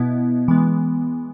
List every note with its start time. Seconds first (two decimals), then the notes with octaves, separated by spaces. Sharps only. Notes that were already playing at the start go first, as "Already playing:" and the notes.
Already playing: B2 B3 E4
0.48 E3 G#3 B3